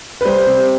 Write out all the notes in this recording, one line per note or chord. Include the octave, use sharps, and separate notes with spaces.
B4
G3 C5
C3